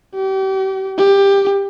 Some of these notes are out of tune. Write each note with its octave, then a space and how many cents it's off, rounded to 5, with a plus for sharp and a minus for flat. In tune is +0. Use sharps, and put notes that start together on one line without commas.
G4 -35
G4 +15